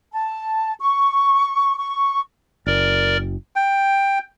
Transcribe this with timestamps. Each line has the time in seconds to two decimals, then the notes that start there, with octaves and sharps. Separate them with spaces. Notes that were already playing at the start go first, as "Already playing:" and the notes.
0.12 A5
0.79 C#6
1.77 C#6
2.66 F#1 A#4 D5
3.56 G5